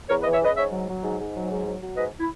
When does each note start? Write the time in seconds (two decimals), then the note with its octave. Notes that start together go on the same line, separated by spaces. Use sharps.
0.09 E2 A#4 C#5
0.21 B4 D#5
0.25 E3
0.33 C#5 E5
0.41 C#3 B4 D#5
0.56 G#2 C#5 E5
0.72 F#3
0.88 F#3
1.03 G#2
1.19 G#2
1.35 F#3
1.50 G#2
1.66 F#3
1.82 F#3
1.97 G#2 B4 D#5
2.20 E4